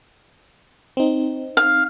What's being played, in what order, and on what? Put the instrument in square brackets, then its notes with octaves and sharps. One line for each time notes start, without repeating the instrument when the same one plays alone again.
[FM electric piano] C4 D#4
[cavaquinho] F5